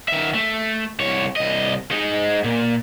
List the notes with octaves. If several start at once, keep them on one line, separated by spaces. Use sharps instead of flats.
D#3 E5
A3
C2 C#5
C2 D#5
G#3 D#4
A#2